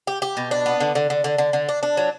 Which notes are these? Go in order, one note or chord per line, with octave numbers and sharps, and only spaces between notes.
G4
G4
B2
D4
B3
D3
D3
D3
D3
D3
D3
D4
D4
F#3